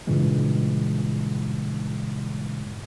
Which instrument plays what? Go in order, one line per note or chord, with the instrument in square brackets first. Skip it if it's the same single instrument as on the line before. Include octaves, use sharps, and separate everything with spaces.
[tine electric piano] G2 A#2 C#3 E3 G#3